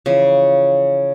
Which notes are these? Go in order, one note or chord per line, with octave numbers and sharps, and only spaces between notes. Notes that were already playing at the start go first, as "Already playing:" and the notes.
C#3 E3 F3